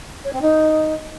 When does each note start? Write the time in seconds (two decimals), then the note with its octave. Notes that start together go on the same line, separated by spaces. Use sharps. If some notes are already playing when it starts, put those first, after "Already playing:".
0.24 C#5
0.33 C4
0.41 D#4